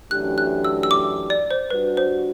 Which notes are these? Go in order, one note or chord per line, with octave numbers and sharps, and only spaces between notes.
F#2 E3 A3 D4 G4 F#6
F#6
E6
E6
D6
D5
C5
G3 D4 F#4 B4
C5